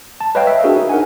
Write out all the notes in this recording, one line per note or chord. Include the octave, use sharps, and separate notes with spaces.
A5
B4 C#5 D#5 F5 G5
E5
D4 F#4 G#4 A#4
D#4
A#4 F#5 G#5